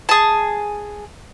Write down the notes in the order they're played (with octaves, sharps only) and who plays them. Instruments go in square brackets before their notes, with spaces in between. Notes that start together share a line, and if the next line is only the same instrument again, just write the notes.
[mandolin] G#4 A5